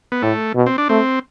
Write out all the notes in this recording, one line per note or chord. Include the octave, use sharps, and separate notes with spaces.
B3
A2 A3
B2
C4
D4
A3 C4